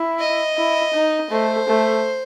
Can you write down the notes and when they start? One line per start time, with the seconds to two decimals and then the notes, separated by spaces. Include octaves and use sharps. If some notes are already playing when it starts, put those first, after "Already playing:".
Already playing: E4
0.19 D#5
0.56 E4
0.93 D#4
1.30 A3 C5
1.68 A3